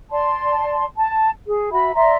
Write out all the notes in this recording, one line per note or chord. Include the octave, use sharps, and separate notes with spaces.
D5 A5 C6
A5
G#4
F#4 E5 B5
D5 E5 A#5 C6